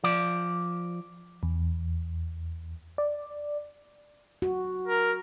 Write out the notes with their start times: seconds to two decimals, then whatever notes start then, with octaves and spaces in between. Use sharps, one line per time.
0.04 F3 D5
1.43 E2
2.98 D5
4.42 F#4
4.88 A#4